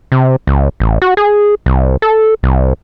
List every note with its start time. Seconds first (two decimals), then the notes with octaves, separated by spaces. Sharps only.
0.12 C3
0.47 C#2
0.80 A1
1.02 F#4
1.17 G#4
1.66 C2
2.02 A4
2.43 C2